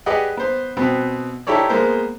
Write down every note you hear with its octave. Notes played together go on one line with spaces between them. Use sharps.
G4 G#4 B4 D5 D#5 F#5
B3 C5
B2 B3 C4
D#4 E4 G4 A4 C#5 D5
G#3 A#3 B3 C5